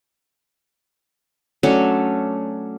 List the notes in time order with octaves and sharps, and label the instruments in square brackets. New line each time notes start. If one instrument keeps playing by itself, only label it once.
[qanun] F#3 A3 C#4 D4